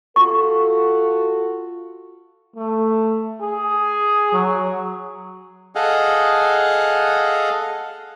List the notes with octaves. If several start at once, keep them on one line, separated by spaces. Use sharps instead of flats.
F4 F#4 A4 C#6
A3
G#4
F#3
G#4 A4 D#5 F5 F#5